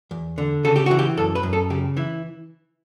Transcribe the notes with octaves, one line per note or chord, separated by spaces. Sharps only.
E2
D3
C#3 A4
G4
E3 F#4
G4
F#2 A4
B4
F#2
A4
C#3 G4
E3 E4